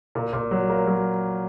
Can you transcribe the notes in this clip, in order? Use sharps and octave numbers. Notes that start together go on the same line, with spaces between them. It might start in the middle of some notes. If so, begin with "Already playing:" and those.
A#2
A#2
F#3
A#3
F#3